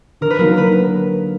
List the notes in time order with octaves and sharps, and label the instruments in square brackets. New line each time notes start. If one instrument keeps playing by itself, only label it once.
[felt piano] D3 [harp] A#4
[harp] B4
[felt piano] F#3 A#3 D#4 [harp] A#4
[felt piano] D3 [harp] B4